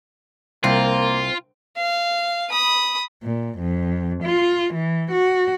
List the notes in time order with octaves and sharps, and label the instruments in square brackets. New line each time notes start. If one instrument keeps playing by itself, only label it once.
[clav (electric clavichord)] C2 [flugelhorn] A#3 [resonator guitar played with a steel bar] C4 [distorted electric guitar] F4
[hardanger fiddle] F5
B5 D#6
[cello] A#2
F2
F4
E3
F#4